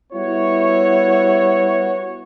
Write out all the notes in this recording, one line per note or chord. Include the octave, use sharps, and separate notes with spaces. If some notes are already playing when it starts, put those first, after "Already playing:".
G3 B3 E4 F#4 C#5